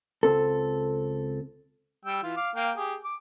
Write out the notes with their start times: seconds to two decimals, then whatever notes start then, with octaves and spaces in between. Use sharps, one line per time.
0.23 C#2 C4 A4
2.05 G3 G5 E6
2.23 E3 F4
2.37 F5 D6
2.56 A#3 F5 G5
2.76 G4 G#4
3.04 D6